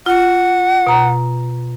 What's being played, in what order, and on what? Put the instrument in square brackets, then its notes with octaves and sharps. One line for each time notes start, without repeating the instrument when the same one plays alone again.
[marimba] F4 [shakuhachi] F#5
[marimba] B2 A#5